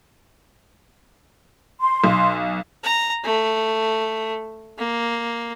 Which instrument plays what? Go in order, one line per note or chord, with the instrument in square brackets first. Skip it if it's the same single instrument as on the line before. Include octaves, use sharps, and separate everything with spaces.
[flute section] C6
[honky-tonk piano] B1
[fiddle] A#5
A3
A#3